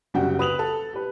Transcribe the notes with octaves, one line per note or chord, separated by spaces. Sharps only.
F#1 C#3 G3 F#4 F#5 G5
B4 D#6 F7 F#7
A4
G4 B4